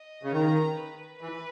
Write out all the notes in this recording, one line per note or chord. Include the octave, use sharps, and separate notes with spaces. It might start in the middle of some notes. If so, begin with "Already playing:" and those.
Already playing: D#5
C#3
D#3 A#5
B4
E3 B4